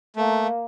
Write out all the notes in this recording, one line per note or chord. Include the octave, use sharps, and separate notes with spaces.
A3 A#3